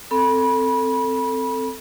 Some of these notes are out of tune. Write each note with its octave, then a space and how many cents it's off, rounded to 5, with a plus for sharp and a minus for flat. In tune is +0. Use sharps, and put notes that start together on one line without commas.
C4 -10 A4 +10 B5 -30